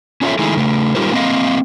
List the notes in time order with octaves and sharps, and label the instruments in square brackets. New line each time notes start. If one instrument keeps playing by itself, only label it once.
[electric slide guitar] C#4 D4 F4 A4 C#5 E5
D#3 G#3 A3 D#4 E4 G#4
C#3 A3
G3 D#4 F4 G4 A#4 C5
A#3 C4 D#5 F5